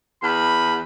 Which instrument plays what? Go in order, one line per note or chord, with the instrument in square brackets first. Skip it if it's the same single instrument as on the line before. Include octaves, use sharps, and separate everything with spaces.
[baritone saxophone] E2 [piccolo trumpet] B5